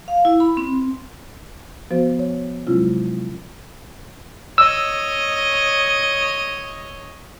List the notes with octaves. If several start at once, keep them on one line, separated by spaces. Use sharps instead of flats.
F5
E4
B5
C4
F3 B3 F#4 C5
C#5
C3 F#3 G#3 C#4 E4 F4
C#5 D#5 E6